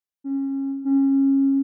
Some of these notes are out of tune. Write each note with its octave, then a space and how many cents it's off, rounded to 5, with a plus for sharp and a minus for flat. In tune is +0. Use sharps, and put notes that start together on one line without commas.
C#4 -25
C#4 -25